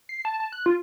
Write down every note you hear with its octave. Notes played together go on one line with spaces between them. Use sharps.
C7
A5
A5
F#6
F4